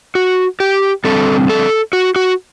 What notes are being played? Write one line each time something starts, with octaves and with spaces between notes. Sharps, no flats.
F#4
G4
D3 G3 C4 A4
A4
F#4
F#4